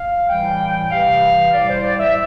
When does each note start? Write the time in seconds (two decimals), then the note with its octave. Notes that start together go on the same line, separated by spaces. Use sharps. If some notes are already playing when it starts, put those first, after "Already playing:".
Already playing: F5
0.28 A2 E3 G3 G5
0.90 C3 E3 G3 F5
1.52 A2 G3 D5
1.68 C5
1.84 D5
1.99 E5